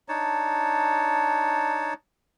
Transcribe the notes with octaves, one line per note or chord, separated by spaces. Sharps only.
D4 D#4 C#5 A5